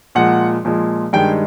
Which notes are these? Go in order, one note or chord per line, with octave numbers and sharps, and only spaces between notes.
A#2 F3 G#3 F#5
A#2 F3 G#3
G2 D#3 G#3 G5